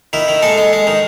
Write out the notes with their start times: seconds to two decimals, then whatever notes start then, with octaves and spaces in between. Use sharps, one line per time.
0.13 D#3 E4
0.28 D#3
0.43 G#3 A4
0.58 G#3
0.73 G#3
0.87 D#3